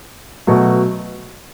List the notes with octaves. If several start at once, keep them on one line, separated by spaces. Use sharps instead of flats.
B2 F#3 A3